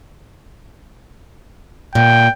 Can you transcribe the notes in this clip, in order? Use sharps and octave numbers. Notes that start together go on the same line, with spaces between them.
A#2 G5